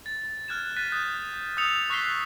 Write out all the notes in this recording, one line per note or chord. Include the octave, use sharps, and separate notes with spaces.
A6
F6 F#6 G#6 E7
F#6 A6 B6 D#7
D#6 G6
D#6 E6 G6 C#7 F7
C#6 F#6 A6 B6 C7 G7